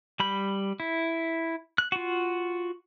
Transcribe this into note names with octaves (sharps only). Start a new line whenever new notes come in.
G3 B5 G6
E4
F#6
F4 F#4